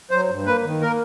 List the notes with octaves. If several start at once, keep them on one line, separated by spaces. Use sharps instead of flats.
F#3 C5
G2
A#3 B4
D#3
A#3 A#4